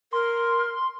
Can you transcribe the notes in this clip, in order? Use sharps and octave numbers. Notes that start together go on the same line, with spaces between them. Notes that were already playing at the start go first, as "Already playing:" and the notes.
A#4 C6